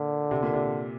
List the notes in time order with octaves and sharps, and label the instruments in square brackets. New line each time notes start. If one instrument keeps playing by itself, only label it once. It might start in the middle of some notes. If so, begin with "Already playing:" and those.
Already playing: [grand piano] A#2 [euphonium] D3
[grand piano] C3
A#2
C3